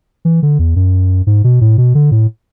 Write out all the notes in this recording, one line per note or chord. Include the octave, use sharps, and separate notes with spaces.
E3
D3
E2
F#2
G#2
B2
A2
B2
D3
A2